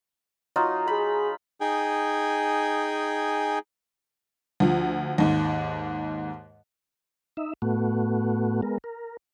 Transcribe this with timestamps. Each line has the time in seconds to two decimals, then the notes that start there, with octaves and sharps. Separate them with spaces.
0.56 F#3 D#4 F4
0.88 G#4 B5
1.61 D#4 G#4 G5 G#5
4.60 D2 F3
5.18 D#2 G#2
7.37 D#4 E5
7.62 A2 A3 B3 F#4
8.62 G#3 B3 A#4
8.84 A#4